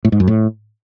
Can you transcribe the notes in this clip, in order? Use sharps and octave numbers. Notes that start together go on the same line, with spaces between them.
A2
G#2
F#2
A2